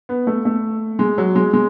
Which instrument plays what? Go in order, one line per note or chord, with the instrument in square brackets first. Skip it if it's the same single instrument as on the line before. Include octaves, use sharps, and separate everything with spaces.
[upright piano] B3
A3
A3
G#3
F#3
G#3
G#3